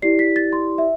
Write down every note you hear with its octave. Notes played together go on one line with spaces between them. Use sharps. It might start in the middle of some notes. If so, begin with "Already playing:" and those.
E4 G4 D5 C7
B6
A6
C6
E5